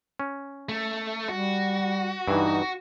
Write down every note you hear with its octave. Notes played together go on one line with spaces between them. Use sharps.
C#4
A3
G3 F#4
G2 E3 D#4